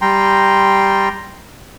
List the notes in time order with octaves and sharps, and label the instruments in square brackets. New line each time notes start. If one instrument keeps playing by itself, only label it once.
[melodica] G3 G5 A#5 C6